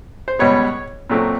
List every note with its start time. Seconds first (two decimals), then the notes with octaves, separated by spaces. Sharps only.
0.28 C5
0.39 C#2 B2 G3 B3 C#5
1.10 A#2 F#3 A3 C4